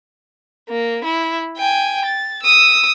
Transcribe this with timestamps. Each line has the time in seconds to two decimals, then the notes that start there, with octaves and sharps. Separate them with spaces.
0.69 A#3
1.04 E4
1.57 G5 G#5
2.05 A6
2.43 D#6 E6